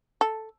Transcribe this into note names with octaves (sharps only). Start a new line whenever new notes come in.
A4